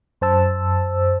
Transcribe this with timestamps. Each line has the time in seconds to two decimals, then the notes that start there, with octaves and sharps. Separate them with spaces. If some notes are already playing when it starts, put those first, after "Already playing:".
0.21 F#2 C5 A5 E6